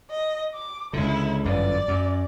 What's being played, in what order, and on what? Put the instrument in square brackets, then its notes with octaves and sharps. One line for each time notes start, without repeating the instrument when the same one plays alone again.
[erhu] D#5
D6
[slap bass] C#2 D3 [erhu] E4
[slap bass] G1 F#2 E3 [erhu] D5
[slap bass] F#2